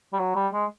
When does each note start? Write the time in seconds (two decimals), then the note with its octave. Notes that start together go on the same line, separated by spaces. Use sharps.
0.13 G3
0.19 F#3
0.36 G3
0.53 G#3